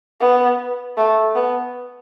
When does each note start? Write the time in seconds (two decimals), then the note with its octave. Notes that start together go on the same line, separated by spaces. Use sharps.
0.21 B3
0.97 A3
1.35 B3